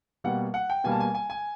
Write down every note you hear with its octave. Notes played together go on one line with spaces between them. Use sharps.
B2 G3 A#3 F#5
F#5
G5
B2 G3 A#3 G#5
A5
G#5
G#5
G#5